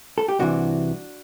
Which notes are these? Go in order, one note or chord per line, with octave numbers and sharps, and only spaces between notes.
A4
G4
C2 C3 E3 D4 F#4